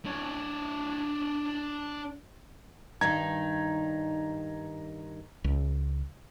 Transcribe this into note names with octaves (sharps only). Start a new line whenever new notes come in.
D4 C#5
G2 D#3 D#4 A#5 G#6
C#2